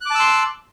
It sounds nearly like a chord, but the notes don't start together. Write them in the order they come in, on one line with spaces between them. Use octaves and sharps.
F#6 D6 A5 E6 C6